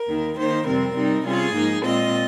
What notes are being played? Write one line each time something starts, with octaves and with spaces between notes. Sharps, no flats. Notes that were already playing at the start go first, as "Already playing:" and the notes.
Already playing: A#4
D#2 D#3 A#3
D#3 A#3 D#4 C5
F2 C3 G3 C4 A#4
C3 G3 C4 D#4
C3 G3 C#4 F4 G#4
G#2 F3 A#3 D#4
A#2 G#3 C4 F4 D#5